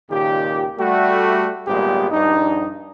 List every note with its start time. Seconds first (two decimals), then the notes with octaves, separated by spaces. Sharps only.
0.11 C#2 A#2 D#3 G4
0.78 G3 A3 F#4
1.67 G#1 A#2 G3 G#3 B3 G4
2.11 A#1 G2 D4 D#4